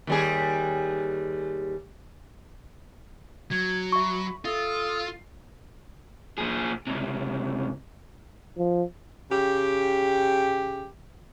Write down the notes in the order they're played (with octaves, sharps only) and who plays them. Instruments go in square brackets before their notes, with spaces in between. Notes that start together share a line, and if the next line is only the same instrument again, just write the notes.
[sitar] D#2 G3 G#4
[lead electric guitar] F#3 [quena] G#6
[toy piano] E5 C#6 [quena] B5
[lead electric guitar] F4 [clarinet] A4 [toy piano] E5 [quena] D#6
[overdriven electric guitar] A#2 G#4
C#2 C3
[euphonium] F3
[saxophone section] C#3 G4